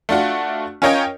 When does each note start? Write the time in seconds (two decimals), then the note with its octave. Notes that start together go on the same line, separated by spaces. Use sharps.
0.09 A3 D4 F4 F#4
0.82 C#4 F4 A#4 C#5 D#5 G5